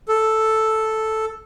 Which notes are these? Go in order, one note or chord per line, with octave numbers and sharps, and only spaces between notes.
A4